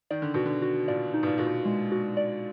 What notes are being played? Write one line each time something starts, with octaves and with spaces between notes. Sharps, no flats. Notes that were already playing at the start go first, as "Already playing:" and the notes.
D#3 D5
D3
B2 F#4
D3
F#4
A#2 D5
D#4
B2
A#2
A#2 F#4
B2
G#3
F#4
D5